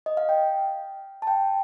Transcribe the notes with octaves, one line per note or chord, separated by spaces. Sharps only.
D#5
F5
G5
A5
G5